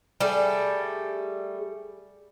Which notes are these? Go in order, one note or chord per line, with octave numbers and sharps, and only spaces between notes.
G3 A3 G#4